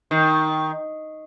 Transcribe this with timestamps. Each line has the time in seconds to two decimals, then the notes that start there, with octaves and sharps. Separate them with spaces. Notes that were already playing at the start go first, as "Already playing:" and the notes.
0.11 D#3